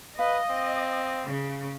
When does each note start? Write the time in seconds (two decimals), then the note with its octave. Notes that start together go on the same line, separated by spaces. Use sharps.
0.19 B4 D#5 F5
0.50 C4
1.26 C#3